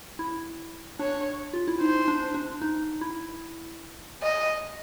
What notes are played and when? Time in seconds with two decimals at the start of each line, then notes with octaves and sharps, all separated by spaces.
0.19 E4
0.99 D4 C#5
1.53 F4
1.68 E4
1.80 D#4 C5
2.08 D4
2.34 D4
2.62 D#4
3.01 E4
4.23 D#5